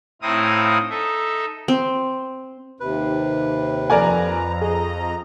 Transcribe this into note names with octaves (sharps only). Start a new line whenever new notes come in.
A2 C4 D#4 E4 F5 D#6
D#4 A4 E5
C4
D#2 C3 B4
F2 A#4 D5 G#5 A#5
G#4 D#5